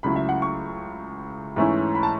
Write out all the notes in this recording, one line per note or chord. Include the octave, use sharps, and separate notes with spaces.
C#2 C#3 F#3 A3 E4 B5
E5
F#5
C#6
G#2 E3 A3 C#4 E4
B5
A5